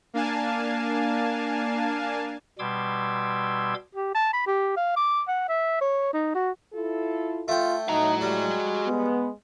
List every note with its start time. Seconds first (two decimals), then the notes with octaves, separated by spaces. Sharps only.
0.14 A#3 D4 F5 G#5 A5
2.59 B2 G3 C6 D6 E6 G#6
3.94 G4
4.15 A5
4.33 B5
4.47 G4
4.77 F5
4.96 D6
5.28 F#5
5.49 E5
5.81 C#5
6.13 D#4
6.35 F#4
6.73 E4 F4 A4
7.48 A3 F4 G5
7.89 A2 D#4 F#4 A#5
8.21 G3 G#3
8.87 B3